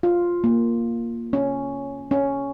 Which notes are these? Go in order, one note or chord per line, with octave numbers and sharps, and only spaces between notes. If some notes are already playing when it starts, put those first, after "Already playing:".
F4
A#3
C#4
C#4